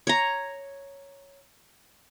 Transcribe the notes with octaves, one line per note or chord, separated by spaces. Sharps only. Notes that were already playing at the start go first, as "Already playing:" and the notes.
C#5 A#5